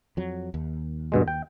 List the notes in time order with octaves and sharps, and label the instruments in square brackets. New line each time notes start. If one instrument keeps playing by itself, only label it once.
[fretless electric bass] F2 F#3
D#2
[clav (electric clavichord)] G2 B2 G#3
G5